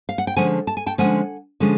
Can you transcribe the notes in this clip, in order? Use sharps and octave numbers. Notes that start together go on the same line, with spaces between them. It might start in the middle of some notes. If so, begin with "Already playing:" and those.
F5
F#5
G5
D3 F3 G#3 C#4 F#5 G#5
A5
G#5
G5 A5
D3 F3 G#3 C#4 F#5 G#5
D3 F3 G#3 C#4